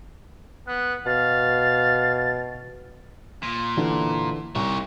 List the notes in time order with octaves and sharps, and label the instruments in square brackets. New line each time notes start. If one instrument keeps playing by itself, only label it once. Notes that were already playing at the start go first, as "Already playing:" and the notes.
[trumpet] B3 [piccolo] F#6
[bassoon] B2 [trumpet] F5 [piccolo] A6
[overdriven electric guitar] A#2
[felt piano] D3 E3
[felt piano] C2 [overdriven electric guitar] D#4 C#5